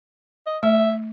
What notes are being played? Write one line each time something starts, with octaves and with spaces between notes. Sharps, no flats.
D#5
A3 E5